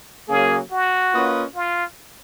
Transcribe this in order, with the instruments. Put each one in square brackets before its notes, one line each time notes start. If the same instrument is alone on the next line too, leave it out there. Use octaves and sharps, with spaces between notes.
[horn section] C#3 F#3 A#3 [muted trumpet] G#4
[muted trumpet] F#4
[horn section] A#3 C#4 F4 B4 D#5
[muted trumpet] F4